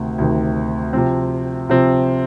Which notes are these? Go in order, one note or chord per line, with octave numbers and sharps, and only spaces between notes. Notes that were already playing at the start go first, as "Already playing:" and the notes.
Already playing: D2 C3 D#3
D2 C3 D#3
C3 F3 C4
C3 F3 C4